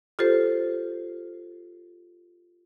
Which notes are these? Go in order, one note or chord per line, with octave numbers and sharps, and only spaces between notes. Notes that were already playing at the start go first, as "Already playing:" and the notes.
F4 G4 A4 C5